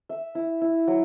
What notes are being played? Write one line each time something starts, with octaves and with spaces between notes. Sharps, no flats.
E5
E4
E4
F#3